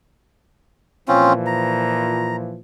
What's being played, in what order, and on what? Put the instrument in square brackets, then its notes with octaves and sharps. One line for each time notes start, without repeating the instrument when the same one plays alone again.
[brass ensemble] A#2 E3 F3 [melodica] C4 C#4 F4
[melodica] A#5